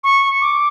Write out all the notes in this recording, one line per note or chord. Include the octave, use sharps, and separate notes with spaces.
C#6
D6